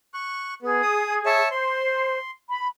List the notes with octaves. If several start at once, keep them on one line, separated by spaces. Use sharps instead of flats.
C#6 F#6
B3 G#4
D#6
C#5 E5 A5
C5 C6
B5